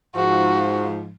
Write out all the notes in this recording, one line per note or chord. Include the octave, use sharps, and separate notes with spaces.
G#2 F3 F#4